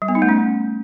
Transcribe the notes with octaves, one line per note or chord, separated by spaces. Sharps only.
G3
B3
D#4
A3
C#4